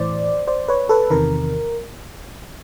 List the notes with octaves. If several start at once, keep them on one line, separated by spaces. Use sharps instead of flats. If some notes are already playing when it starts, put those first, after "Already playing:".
Already playing: A2 E3 C5 D5
C5 D5
B4 C#5
A4 B4
E2 C3 D#3 A#4